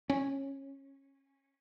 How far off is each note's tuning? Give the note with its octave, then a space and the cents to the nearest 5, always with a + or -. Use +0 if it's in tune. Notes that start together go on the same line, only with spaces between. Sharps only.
C#4 -20